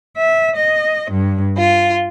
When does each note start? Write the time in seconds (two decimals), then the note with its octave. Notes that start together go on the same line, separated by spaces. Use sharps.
0.16 E5
0.56 D#5
1.11 G2
1.56 F4